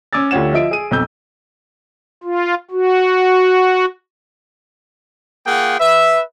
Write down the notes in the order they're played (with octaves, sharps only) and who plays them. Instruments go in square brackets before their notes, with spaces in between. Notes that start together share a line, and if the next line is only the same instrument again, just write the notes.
[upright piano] C#4 D6 E6 A6
D2 F4 G4 C#5 F#5 E7
F3 F4 D#5 E5 D7
G#4 D#7
B1 F2 E6 G6
[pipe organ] F4
F#4
[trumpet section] A#3 F4 G#4 F#5 G5
B4 E5